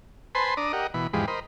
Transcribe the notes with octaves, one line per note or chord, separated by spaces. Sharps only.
B4 C5 G#5 A5 B5 C6
D4 D5 A#5 D#6
G4 A#4 D#5 F#5
B2 E3 B5
E2 G#2 F3 G#3 G4 B5
A#4 C5 D#5 B5